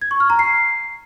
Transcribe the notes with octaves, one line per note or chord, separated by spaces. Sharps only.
G#6
C#6
F6
A#5
C7